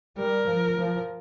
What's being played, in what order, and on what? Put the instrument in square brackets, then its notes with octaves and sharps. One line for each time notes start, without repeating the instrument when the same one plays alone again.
[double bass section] G3 [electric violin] A#4
[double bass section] F3
F3